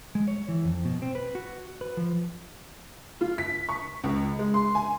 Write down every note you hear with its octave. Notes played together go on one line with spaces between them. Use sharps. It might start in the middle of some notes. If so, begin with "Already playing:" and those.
G#3
C#5
E3
F2
B2
C4
B4
F#4
B4
F3
F4
B6
C#6
C#2
G#3
C6
G#5